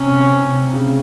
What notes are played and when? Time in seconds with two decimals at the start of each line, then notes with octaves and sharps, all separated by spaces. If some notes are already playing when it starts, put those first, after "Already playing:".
Already playing: C3 C#4
0.33 C3
0.67 C3
0.74 C#3